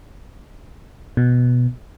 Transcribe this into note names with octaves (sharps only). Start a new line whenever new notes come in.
B2